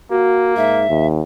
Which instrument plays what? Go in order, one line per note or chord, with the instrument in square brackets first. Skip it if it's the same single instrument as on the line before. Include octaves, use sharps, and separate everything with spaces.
[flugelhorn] A#3 [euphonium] F#4
[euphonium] G#2 [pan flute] E5
[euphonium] D#2